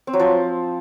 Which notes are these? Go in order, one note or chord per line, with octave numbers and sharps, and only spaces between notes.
C4
F#3
F3